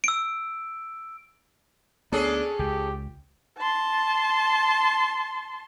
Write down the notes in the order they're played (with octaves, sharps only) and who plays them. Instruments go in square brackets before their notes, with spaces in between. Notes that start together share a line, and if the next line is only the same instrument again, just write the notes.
[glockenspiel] E6 D7
[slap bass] D2 B3 [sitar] C#4 G#4 A4 [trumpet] D4
[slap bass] C#2 [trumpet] G4
[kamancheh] A5 C6